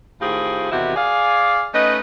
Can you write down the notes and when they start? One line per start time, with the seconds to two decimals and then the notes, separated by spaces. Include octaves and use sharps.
0.21 A2 D#3 C4 F4 G4 G#4
0.71 E2 C3 D#3 E4 F#4 G4
0.96 G#4 D5 F5
1.74 A3 C#4 D#4 B4 D#5